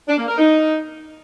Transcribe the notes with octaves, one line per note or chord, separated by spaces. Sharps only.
D4
A#3
A#4
D#4